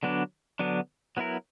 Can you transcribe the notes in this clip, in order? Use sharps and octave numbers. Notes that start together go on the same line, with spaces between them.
D3 F#3 B3 D4
D3 F#3 B3 D4
F#3 B3 E4 A#4